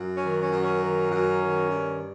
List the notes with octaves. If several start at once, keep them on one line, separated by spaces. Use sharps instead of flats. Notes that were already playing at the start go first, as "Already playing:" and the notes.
Already playing: F#2
C#4
D#3
C#4
F#2
C#4
D#3
F#2
D#3
G2